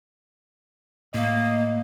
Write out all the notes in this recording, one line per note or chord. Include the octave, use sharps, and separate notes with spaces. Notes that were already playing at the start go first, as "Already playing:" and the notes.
A2 A#3 D#5